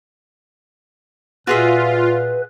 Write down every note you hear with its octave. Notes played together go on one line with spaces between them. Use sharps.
A#2 F4 F#4 G#4 B4 E5